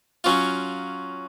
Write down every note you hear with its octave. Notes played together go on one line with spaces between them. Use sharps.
F#3 C#4 F4